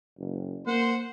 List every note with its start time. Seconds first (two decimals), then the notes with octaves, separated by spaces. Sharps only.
0.19 F#1
0.67 A#3 C5 F#5